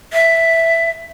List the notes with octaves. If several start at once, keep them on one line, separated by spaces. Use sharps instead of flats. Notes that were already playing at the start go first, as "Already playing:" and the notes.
E5